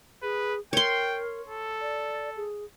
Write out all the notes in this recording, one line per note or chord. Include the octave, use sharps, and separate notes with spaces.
G#4 B4
A#4 C#5 G5 C6
A4
D5
G#4